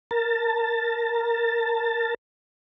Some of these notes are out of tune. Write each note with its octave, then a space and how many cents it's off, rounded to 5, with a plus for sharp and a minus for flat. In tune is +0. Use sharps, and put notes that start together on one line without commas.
A#4 +0 A5 +20